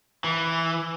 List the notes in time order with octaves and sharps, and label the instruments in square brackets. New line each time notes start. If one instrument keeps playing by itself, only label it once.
[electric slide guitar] E3